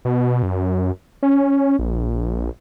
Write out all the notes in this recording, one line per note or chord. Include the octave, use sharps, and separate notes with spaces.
B2
F#2
C#4
A#1